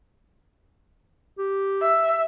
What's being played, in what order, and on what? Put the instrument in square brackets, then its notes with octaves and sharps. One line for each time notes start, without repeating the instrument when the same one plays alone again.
[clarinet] G4
[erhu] E5